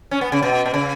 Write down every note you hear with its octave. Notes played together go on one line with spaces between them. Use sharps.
C#4
B3
C#3
B2
B2
C#3